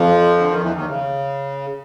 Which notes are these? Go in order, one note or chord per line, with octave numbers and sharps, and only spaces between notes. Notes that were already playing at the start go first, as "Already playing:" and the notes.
Already playing: F2 F3
D3
D#3
E2 E3
D#2 D#3
C#3